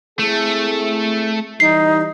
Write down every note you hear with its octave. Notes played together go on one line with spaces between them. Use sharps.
A3 C4 E4 G#4
E3 G3 D#4 C7